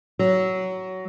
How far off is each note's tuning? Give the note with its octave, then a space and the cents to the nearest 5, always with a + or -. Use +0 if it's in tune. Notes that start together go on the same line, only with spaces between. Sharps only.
F#3 +15